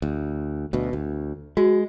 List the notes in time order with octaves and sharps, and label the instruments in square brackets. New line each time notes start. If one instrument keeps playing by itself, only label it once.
[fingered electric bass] D2
D2 B2
D2
[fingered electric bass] G#3 [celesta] F#4